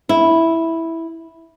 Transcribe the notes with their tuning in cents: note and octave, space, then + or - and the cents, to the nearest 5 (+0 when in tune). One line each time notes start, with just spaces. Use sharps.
E4 -5